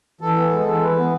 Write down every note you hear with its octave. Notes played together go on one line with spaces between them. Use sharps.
E3 A4
B3
G#3
E3
E3 B4
B3